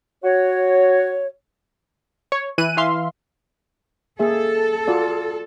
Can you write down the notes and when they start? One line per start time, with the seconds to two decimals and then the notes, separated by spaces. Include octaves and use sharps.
0.24 F#4 C#5
2.32 C#5
2.58 E3 E4 F#6 D#7
2.77 E3 E5 F5 C6
4.19 A#3 G#4 A4 E5
4.87 F4 F#4 D5